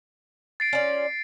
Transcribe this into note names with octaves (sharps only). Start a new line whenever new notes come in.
A6 C7 D7
C#4 F4 D5